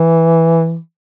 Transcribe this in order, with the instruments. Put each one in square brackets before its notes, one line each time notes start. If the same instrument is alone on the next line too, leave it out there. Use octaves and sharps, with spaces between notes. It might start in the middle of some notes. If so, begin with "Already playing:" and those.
Already playing: [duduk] E3